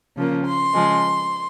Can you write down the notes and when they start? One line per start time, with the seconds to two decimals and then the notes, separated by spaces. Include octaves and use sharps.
0.17 C#3 F3 A#3
0.46 C6
0.73 C#3 F3 G#3